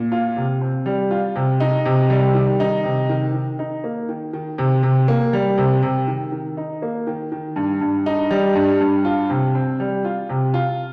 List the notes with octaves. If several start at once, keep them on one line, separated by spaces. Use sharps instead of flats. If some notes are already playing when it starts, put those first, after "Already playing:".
Already playing: A#2
F4
C3
C4
G3
F4
C3
D#4
C3
G3
D#3
D#4
C3
D#3
D#3
D#4
A#3
D#3
D#3
C3
C3
A#3
G3
C3
C3
D#3
D#3
D#4
A#3
D#3
D#3
G2
G2
D#4
G3
G2
G2
F4
C3
C4
G3
F4
C3
F4